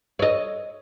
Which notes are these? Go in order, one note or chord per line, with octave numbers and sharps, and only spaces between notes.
C#5 D#5